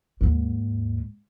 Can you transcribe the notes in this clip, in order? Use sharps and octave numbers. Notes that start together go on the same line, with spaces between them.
D#2 G#2